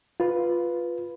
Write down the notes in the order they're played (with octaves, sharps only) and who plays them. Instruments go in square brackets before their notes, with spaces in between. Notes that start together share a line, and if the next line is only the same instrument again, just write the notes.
[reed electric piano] F4 B4